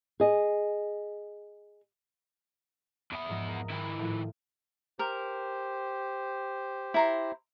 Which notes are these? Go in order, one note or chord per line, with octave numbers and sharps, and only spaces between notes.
G#4 D#5
E2 E5 F#5 B5 D#6
G#2 F3 D#5
A#4
D#3 E4
A2 F3 F4
G4 A#4 C5
E4 A#5 C6